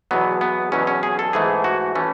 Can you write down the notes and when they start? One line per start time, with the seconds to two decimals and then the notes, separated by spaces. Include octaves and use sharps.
0.11 E2 B2 F#3 B3
0.41 B3
0.72 E2 B2 F#3 C#4
0.87 C#4
1.03 G#4
1.19 A4
1.33 G#2 E3 A3 G#4
1.64 F#4
1.95 E3 A3 C#4